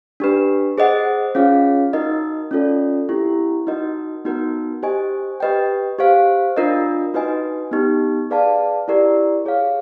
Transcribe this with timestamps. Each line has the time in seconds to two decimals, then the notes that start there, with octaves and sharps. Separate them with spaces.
0.20 D4 G4 B4
0.78 G#4 C5 D#5 F#5
1.35 C#4 F4 G#4 C#5 F5
1.93 D#4 F#4 A#4 D#5
2.51 C#4 F4 A4 D5
3.09 C4 E4 G4 A#4
3.67 D#4 F#4 A#4 D#5
4.25 B3 D#4 F#4 A#4
4.83 G4 C5 D#5 G#5
5.40 G4 B4 D#5 G5
5.99 G4 C5 F5
6.56 D4 F4 A#4 D#5
7.14 D#4 F#4 B4 D#5 G#5
7.72 B3 D#4 G4
8.30 G#4 B4 D5 F5 A5
8.88 E4 G4 A#4 D5
9.45 G#4 C#5 F5